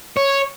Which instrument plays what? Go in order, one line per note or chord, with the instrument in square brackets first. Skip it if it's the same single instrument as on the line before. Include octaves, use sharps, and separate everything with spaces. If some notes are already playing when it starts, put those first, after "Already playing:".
[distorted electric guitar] C#5